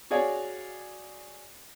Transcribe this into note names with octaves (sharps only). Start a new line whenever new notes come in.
F#4 G#4 C#5 D5 F5 G#5